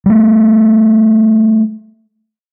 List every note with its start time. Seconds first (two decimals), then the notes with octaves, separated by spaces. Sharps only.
0.06 G3 A3